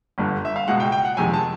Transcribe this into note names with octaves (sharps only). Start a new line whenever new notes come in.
G1 G2 D3
E5
F5
C#2 B2 G#3 F#5
G5
G5
F#5
G1 F2 C3 D#3 G#3 G#5
A5